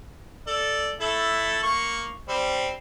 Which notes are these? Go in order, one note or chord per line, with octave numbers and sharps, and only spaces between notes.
A4 D5
A3 E4 A4
A#3 C#6
G3 C4